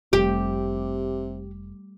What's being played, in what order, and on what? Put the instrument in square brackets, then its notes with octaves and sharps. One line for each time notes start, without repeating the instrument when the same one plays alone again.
[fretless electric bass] F1 [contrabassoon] C3 [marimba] G3 A3 [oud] G4